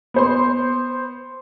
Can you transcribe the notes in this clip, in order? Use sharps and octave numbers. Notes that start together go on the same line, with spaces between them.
B3 C5 C6